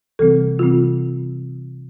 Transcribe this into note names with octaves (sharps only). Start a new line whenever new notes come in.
C3 E3 G3 C4 A4
C3 E3 G3 C4 F4